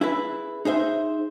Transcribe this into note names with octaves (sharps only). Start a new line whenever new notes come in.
E4 G#4 B4
D#4 G#4 C5 E5